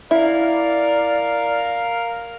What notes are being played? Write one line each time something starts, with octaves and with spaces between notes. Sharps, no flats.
E4 A#4 D5 F5